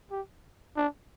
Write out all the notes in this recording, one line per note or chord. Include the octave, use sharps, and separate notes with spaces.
G4
D4